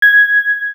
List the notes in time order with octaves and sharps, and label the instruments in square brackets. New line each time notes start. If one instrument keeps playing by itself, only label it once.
[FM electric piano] G#6